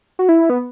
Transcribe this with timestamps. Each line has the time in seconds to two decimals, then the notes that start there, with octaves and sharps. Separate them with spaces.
0.19 F#4
0.29 E4
0.50 B3